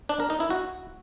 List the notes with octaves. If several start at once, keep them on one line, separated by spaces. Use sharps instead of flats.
D4
A#4
D#4
E4
F#4